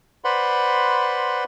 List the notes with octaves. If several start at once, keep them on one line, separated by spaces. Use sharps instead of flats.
B4 C5 D5 F#5 B5 C6